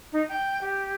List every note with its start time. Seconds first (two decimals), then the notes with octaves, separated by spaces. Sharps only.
0.12 D#4
0.29 G5
0.61 G4